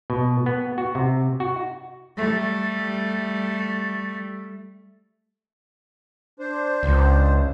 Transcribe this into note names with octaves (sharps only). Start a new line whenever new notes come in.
B2
B3
F#4
C3
F#4
G3 A3
D4 C5
C#2